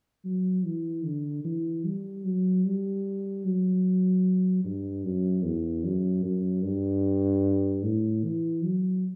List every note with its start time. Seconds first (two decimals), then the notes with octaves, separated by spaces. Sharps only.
0.25 F#3
0.65 E3
1.05 D3
1.44 E3
1.85 G3
2.25 F#3
2.65 G3
3.45 F#3
4.64 G2
5.04 F#2
5.44 E2
5.84 F#2
6.24 F#2
6.64 G2
7.83 A2
8.24 E3
8.63 F#3